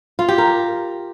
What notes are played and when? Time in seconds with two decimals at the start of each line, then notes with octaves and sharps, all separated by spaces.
0.19 F4
0.29 G4
0.38 A#4